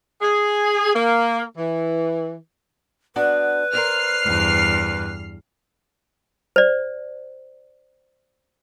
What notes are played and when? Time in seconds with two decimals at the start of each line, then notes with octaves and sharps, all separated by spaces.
0.22 G#4
0.95 A#3
1.57 E3
3.16 B3 D4 F#4 B4
3.73 A#4 C5 D5 F6 C7
4.25 E2 G2
6.56 C5 D5